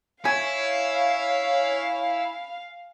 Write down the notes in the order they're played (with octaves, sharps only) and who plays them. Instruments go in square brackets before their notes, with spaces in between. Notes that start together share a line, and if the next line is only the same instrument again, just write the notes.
[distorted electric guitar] E4 [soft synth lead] C#5 [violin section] F5 [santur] G#5